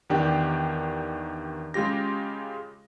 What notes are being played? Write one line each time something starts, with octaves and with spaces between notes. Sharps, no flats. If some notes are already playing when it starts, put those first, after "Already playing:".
E2 D#3 D4 G4 G5
C#3 G#3 F4 G4 A#6